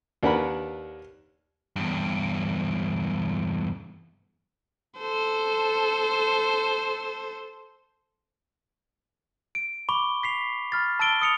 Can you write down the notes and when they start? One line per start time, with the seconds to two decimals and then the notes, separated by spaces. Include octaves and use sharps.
0.23 D#2 D4 A#4 B4 F#5 B5
1.76 E2 G2
4.99 A4 C5
9.55 D7
9.89 B5 C#6 D6 G7
10.23 B6 C7 F7
10.72 B5 F6 A6
10.99 A5 E6 A6 D7 G7
11.21 D#6 C#7 F7